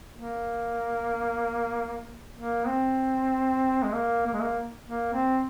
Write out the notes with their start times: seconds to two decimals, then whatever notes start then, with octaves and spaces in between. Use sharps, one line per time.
0.15 A#3
2.36 A#3
2.67 C4
3.83 G#3
3.94 A#3
4.26 A#3
4.34 G#3
4.40 A#3
4.89 A#3
5.13 C4